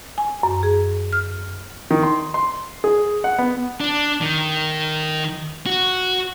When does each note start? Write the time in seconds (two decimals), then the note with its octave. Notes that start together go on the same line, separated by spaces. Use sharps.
0.18 G#5
0.43 F#2
0.63 G#4
1.13 F6
1.91 D#3
2.03 C6
2.34 C6
2.84 G#4
3.24 F#5
3.39 B3
3.81 D4
4.21 D#3
5.66 F#4